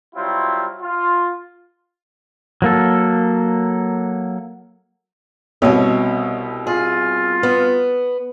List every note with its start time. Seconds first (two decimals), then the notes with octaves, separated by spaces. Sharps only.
0.15 F#3 G3 C4 E4 F4
0.81 F4
2.62 F#3 A#3 A4
5.62 C2 B2 C#5 D#5
6.67 F4 G#4
7.43 B3